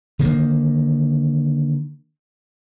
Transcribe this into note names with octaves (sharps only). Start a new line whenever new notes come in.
D3 D#3 A#3